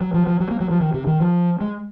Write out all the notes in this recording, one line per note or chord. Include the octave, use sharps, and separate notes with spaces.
F#3
F3
F3
F#3
A#3
F#3
F3
D#3
C3
D#3
F3
G#3